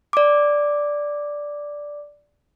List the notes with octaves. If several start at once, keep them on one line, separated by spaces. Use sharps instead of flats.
D5 D6